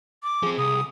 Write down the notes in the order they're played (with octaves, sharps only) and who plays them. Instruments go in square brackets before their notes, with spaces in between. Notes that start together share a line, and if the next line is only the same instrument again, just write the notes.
[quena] D6
[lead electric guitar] F3 C4 [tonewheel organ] G#4
[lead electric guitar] C2 [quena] D#6